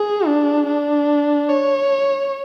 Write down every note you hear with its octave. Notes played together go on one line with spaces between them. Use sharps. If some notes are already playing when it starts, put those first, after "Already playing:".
Already playing: G#4
D4
D4
C#5